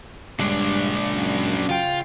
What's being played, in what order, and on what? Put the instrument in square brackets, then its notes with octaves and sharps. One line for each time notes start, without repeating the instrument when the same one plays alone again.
[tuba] G2 [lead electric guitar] A#2 D4 [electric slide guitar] C#3 G#3
[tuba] F#2
[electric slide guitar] C#3 G5 [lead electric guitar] F4